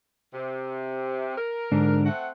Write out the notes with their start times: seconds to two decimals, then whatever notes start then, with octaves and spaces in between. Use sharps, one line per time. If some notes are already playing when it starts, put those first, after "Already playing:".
0.34 C3
1.38 A#4
1.72 G#2 D3 D4
2.05 A3 C4 F#5